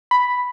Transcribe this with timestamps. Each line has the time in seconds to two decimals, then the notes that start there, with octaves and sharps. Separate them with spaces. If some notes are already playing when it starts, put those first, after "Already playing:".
0.11 B5